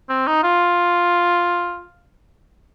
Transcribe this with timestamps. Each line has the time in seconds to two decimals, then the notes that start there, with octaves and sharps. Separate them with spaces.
0.09 C4
0.27 D#4
0.43 F4